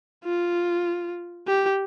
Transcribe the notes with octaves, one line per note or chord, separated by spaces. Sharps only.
F4
G4